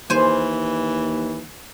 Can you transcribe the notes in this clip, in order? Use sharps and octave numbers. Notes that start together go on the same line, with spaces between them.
D#2 E3 C5 G#5